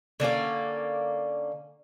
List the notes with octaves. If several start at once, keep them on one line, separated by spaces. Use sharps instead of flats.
D3 A#3 C#4 D5